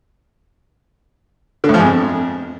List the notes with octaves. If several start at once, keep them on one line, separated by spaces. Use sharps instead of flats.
D3
A2
F3
G#2
F2